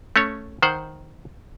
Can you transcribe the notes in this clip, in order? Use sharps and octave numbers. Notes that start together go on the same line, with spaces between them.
A3 C#4 C#5
D#3 C5 F#5